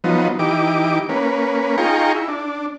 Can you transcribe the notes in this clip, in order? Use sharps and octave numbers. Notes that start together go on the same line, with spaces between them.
F3 F#3 B3 D#4
E3 D#4 G4 D6
A#3 C#4 B4
D#4 F4 G#4 G5 A#5 C#6
E4
D4